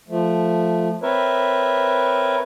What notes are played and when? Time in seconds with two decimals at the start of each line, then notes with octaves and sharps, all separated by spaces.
0.09 F3 A3
1.02 C4 A#4 B4 C#5 E5